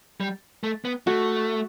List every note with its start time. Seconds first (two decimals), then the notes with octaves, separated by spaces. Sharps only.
0.20 G3
0.63 A3
0.85 B3
1.07 A3 F#4